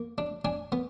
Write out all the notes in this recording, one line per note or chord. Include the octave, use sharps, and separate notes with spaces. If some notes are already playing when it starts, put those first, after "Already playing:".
Already playing: A#3
D4
D4 G#5
B3